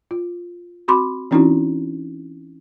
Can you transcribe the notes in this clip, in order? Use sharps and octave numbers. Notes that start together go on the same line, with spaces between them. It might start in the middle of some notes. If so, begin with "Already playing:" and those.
F4
C4 F#4 B5 C6 D6
E3 C4 C#4 D#4 E4 F#4